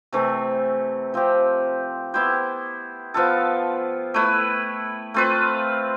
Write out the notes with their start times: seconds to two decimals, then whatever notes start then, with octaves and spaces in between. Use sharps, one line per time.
0.13 C3 E3 A3
1.14 F3 C4 G4
2.14 B3 E4 G4 C5
3.14 F3 B3 F4 A4
4.14 A3 E4 B4
5.14 A3 C4 F4 B4